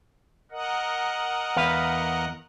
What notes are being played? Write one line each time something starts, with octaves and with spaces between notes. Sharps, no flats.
A#4 D#5 F#5
E2 B4 F5